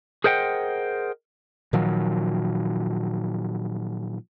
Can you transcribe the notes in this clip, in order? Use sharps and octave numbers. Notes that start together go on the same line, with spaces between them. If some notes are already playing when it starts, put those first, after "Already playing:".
G#4 A#4 C5 D#5 F#5 G5
A#2 D#3 F3 F#3